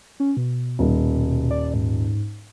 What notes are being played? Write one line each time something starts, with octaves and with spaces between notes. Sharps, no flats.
C#4
B2
D#1
D5
G#2